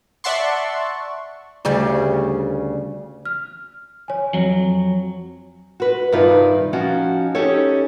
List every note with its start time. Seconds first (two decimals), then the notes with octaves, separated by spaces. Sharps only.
0.24 D5 E5 F#5 A5 C6 C#6
1.65 D2 C#3 G3
3.26 F6
4.08 C#5 G#5
4.34 F2 F#3
5.80 F#4 B4
6.12 G2 C3 D#3 D#4 F4 B4
6.73 F3 C#4 D#4 F#4
7.35 C#4 D#4 G4 A4 C#5